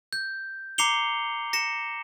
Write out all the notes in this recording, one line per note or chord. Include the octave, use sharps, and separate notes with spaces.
G6
A#5 D6 C7 C#7 F7 G7
A#6 C#7 E7